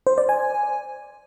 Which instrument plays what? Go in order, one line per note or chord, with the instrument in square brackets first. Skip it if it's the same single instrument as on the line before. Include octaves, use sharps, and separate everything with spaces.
[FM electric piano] C5
D5
G#5